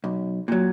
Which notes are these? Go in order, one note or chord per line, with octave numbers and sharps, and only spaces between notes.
B1
A#2 F#3